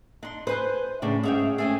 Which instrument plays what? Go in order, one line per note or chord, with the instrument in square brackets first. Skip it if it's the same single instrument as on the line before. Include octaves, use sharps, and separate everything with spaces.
[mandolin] D4 C6 [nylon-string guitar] D#4
[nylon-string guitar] B4 [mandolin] C5 G#5 F#6
[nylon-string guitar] A2 C#3 D4 [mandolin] D5
[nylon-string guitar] G#2 C#4 E5 [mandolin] G#4 F5 G5
[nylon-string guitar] A3 C4 C#4 [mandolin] G#4 A4 G#5